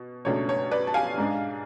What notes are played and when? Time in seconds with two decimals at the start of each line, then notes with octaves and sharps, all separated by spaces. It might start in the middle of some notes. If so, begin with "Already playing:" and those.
Already playing: B2
0.25 C#2 B2 A3 D4 C#5
0.49 C#5
0.71 B4 D5
0.87 A5
0.94 F5 G#5
1.17 G#2 G#3 D4